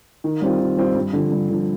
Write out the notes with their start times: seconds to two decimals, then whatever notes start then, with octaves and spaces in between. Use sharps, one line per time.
0.24 D#3
0.41 G3 C4 F4
0.60 D#3
0.77 G3 C4 F4
0.96 G2
1.13 D3 F3
1.32 G2
1.49 D3 F3